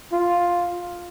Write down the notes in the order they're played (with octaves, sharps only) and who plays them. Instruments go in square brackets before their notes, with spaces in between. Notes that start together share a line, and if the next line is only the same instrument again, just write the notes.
[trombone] F4